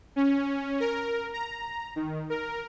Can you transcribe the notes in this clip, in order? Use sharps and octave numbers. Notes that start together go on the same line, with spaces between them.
C#4
A#4
A#5
D#3
A#4